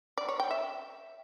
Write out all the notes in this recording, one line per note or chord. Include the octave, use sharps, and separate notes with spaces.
D5
C#5
G5
E5